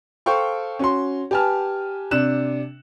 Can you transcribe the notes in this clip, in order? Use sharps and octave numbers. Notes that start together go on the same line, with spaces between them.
A4 C5 F5 G5 C#6
C#4 F#4 C6
G4 B4 G#5 A5 F6
C3 D4 F#6 E7